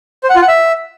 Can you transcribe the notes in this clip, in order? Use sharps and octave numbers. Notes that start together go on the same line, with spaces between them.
C5
F#5
F4
F#5
E5